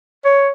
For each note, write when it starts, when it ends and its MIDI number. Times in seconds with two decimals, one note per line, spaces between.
0.24 0.50 73